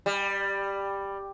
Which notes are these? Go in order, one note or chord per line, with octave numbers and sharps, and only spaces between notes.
G3